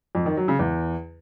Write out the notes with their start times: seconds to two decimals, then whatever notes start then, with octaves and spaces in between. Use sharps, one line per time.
0.15 F2
0.26 D#3
0.37 F#3
0.48 C#3
0.59 E2